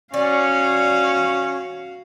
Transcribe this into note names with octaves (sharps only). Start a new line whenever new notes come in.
C#4 F#4 D5 F5